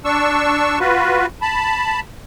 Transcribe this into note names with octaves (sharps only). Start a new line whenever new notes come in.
D4 C#6 E6
F4 F#4 B4
A5 B5